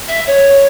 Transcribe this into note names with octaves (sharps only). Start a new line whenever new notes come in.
E5
C#5